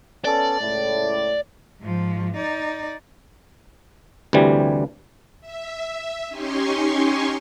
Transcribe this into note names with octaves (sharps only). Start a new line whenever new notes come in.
B3 C#4 A4 D5
C#2 A2
G#2 F3
D#4 D5
D2 C3 E3 G3
E5
C#4 D#4 G4 G#5 C6 C#6